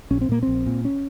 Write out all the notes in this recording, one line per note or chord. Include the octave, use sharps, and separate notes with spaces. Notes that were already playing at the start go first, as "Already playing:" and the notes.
A#1 C#4
C4
A#2 A#3
A#1 C4
A#2
C#4